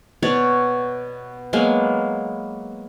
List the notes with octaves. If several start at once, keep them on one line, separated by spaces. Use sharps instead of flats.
B2 C#5 D5
F#3 G#3 A#3 B3